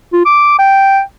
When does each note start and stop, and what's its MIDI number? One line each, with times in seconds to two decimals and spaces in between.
0.13 0.21 65
0.25 0.55 86
0.59 1.01 79